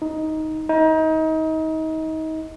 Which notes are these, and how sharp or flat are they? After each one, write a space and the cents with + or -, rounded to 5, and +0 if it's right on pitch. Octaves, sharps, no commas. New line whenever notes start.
D#4 +10
D#4 +30